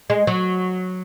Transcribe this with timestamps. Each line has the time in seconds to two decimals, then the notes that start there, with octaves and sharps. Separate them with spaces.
0.10 G#3
0.27 F#3